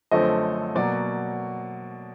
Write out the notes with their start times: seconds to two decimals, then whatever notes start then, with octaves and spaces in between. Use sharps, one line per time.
0.11 F#2 D3 F3 A3 C4 D#5
0.75 B2 F#3 A#3 D5